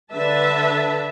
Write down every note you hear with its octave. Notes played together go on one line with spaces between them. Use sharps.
D3 B4 E5 A5